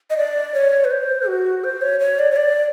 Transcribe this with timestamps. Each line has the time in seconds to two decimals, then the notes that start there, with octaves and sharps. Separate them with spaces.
0.10 D#5
0.17 D5
0.54 C#5
0.85 B4
0.91 C5
1.27 F#4
1.64 C5
1.82 C#5
2.00 C#5
2.19 D5
2.31 C#5
2.36 D5